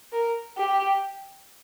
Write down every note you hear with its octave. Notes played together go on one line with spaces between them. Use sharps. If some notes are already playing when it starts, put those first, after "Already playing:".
A#4
G4